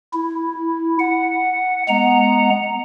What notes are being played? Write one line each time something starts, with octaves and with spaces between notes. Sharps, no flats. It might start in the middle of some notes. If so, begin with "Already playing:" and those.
E4
F#5
G#3 B3 F#5 A#5